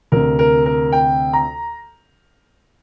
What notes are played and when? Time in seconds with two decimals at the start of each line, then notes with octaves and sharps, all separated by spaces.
0.12 D2 C3 A#4
0.39 A#4
0.66 A#4
0.92 G5
1.33 A#5